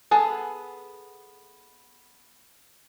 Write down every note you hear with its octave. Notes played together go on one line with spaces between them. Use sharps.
B3 G#4 A4 F#5 A5